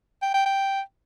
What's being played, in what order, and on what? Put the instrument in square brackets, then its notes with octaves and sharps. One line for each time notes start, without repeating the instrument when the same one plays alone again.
[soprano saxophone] G5
G5
G5